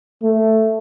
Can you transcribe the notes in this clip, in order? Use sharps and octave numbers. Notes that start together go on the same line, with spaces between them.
A3